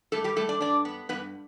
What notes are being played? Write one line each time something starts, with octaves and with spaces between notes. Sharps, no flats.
G2 A3 A4
G3 G4
G3 A3 A4
D4 D5
G2 D4 D5
B3
G2 B3 B4